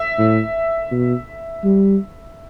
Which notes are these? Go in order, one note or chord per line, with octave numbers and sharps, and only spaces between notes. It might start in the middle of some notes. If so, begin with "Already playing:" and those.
Already playing: E5
A2
B2
G3